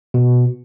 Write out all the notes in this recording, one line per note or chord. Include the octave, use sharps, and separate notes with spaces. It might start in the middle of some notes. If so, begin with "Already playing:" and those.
B2